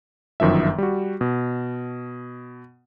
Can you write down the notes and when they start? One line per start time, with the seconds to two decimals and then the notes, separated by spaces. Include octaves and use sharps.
0.40 G1 F#2 D#3 F3 E5
0.78 G3 F#4
1.21 B2